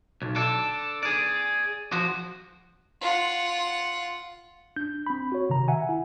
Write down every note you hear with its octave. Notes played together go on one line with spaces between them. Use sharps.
B1
D4 A4
G#4 D5
F3 F#4
F4 F#5
D4 G6
C4 B5
F#4 C#5
C3 D#3 A#5
E5 F#5 G#5
E4